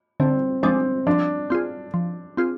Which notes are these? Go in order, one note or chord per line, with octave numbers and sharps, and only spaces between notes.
D3 C4
F3 G#3 C4 D4
F3 D4
C4 F4 G#4
F3
C4 F4 G#4